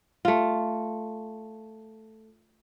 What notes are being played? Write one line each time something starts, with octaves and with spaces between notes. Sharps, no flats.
A3 F4